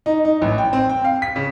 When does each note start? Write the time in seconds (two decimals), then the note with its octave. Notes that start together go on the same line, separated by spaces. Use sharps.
0.06 D#4
0.25 D#4
0.42 A1
0.58 G5
0.73 C4
0.89 G5
1.05 F5
1.22 B6
1.36 C#3